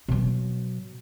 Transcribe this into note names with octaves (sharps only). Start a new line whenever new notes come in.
B2 F#3